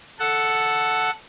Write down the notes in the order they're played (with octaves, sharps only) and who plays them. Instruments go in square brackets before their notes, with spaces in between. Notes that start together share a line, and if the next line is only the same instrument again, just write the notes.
[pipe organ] A4 F#5